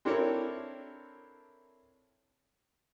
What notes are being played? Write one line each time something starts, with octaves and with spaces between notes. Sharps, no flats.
C4 D4 E4 A4 A#4 C#5